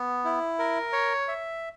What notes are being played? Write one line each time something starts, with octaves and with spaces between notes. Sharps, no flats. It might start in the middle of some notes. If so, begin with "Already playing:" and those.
Already playing: B3
E4
A#4
C#5
E5